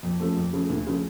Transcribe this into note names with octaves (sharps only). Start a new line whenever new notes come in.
F2
C#3 F3 A3
F2
C#3 F3 A3
D2
C#3 F3 A3